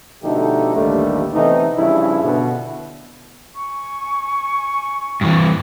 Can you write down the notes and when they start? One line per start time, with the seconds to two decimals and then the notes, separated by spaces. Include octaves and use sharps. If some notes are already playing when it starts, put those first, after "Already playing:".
0.23 B2 D3 F3 A3 D#4 G4
0.75 A1 D#2 D3 G3 A3
1.34 C3 E3 A3 B3 D#4
1.77 G2 C#3 F3 E4
2.23 B2 D3
3.55 G#5 C#6
5.21 G2 E3